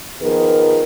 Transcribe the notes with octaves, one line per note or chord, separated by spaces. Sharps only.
D#3 F3 B3 G#4 A#4